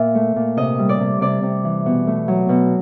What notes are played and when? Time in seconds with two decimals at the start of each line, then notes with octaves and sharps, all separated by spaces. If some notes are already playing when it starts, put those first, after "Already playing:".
Already playing: A#2 E5
0.15 A3
0.36 A#2
0.57 C3 D#5
0.79 G3
0.89 D5
1.00 C3
1.21 C3 D5
1.43 C3
1.64 E3
1.86 B2
2.07 A3
2.28 F#3
2.49 B2